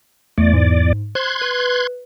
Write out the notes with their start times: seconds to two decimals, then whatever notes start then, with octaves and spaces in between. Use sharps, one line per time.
0.38 E2 A3 D5
0.53 G#2
1.15 C5 C6 F#6 G#6
1.41 B4